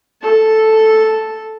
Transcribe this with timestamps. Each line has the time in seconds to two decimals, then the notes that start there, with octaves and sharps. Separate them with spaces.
0.22 A4 A5